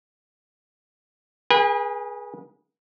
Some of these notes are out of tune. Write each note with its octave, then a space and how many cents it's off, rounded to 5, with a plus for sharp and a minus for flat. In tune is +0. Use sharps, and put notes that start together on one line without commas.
G#4 +0 B4 -35 G#5 -40